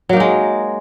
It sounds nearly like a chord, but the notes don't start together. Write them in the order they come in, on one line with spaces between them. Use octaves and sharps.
F#3 A#3 D#4 G#3